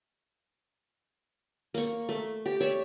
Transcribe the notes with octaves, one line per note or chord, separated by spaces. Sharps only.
A#3 C#6
A3
G4
C#5 D5 E5